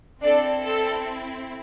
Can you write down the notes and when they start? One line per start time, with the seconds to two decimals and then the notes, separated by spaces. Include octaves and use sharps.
0.22 C4 D4 E4 A4 D5
0.64 A4